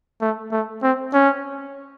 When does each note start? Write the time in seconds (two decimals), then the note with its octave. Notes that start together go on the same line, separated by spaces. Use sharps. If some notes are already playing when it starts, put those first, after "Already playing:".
0.21 A3
0.52 A3
0.83 C4
1.13 C#4